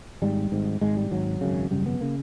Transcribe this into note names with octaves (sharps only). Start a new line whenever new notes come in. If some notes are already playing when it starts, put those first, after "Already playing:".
G#1 G#2 G3
G#1 G#2
G#1 G#2 G#3
G3
G#1 G#2 F#3
G#1 F#2 C#3
G#1 F#2 C#3 G3
B3
C#3 A#3